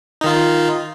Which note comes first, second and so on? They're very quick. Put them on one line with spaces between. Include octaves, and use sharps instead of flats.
D#4 D#3 F4